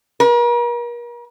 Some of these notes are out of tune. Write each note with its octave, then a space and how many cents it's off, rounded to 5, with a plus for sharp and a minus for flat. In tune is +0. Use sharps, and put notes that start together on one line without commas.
A#4 +40